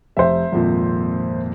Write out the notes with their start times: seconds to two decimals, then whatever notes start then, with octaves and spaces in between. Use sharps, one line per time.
0.17 F1 C5 E5
0.52 G#1 F2 A#2